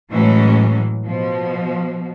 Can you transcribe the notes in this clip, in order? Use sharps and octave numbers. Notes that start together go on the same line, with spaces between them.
A2 E3 F#3 G#3 C#4
B2 F3